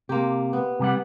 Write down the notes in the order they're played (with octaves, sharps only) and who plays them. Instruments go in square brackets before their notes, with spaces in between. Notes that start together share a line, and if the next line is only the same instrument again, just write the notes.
[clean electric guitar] C3 [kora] A#3 G4
[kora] B3
[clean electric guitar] C3 G3 F#5